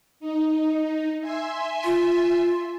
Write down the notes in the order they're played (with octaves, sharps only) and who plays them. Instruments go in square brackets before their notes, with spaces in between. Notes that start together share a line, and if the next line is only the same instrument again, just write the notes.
[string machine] D#4
E5 G#5 C6
[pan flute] F4